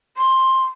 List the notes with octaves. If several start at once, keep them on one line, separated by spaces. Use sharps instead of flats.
C6